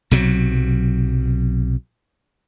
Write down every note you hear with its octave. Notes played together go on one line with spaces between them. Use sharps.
B1 C3 F#3